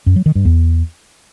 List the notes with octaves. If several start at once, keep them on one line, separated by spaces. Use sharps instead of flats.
F#2
F#3
D#3
G2
E2